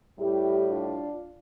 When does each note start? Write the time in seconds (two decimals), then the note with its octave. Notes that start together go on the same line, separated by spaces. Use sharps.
0.18 A2 G3 E4 G4
0.68 D4 F4